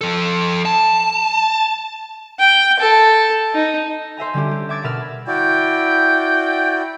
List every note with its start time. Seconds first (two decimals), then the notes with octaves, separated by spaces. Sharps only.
0.01 F3 A4
0.65 A5
2.39 G5
2.79 A4
3.54 D#4
4.17 C5 E5 G#5 A#5
4.34 D3 G3 C#4 G4
4.51 G4
4.69 E5 D6 G#6 A6 D7
4.83 B2 A#4 B4 E5 F6 E7
5.27 E4 F#4 D5 G5